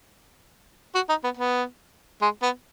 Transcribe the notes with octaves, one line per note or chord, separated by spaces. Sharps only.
F#4
D#4
B3
B3
G#3
B3